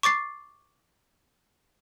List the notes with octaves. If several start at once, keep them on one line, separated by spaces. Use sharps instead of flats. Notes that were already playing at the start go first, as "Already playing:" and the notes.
C#6 D6 A6 C7